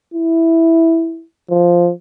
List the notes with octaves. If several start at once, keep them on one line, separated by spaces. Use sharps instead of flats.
E4
F3